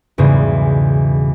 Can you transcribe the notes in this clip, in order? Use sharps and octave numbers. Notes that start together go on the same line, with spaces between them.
B1 E2 G#2 C#3 G3 G#3